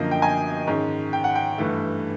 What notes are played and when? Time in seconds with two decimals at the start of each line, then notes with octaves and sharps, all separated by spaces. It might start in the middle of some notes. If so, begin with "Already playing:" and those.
Already playing: F#2 D3 F3 A#3 C#4 D#5
0.11 G5
0.22 G#5
0.67 G#2 D#3 G#3 C#4
1.13 G5
1.24 F#5
1.36 G5
1.58 G2 E3 A3